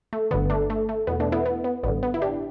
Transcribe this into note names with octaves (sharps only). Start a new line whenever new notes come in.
A3
G1 G2 D3 B3
A3 D4
A3
A3
E2 B2 B3
A3 D4
B3 E4
B3
B3
A1 G2 D3 B3
B3
E4
D4 G4